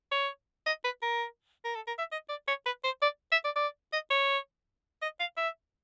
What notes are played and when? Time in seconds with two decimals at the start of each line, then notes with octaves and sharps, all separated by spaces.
0.11 C#5
0.66 D#5
0.84 B4
1.02 A#4
1.64 A#4
1.75 A4
1.87 A#4
1.98 E5
2.12 D#5
2.29 D5
2.48 C#5
2.66 B4
2.84 C5
3.02 D5
3.32 E5
3.44 D5
3.56 D5
3.93 D#5
4.11 C#5
5.02 D#5
5.20 F5
5.37 E5